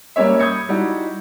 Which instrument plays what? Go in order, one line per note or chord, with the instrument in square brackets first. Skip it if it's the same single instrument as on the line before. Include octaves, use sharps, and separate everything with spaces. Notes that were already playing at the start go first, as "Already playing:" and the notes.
[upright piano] G3 A#3 C#4 C#5 E5
B5 D#6 G6 G#6 C#7
G3 D#4 E4 F#4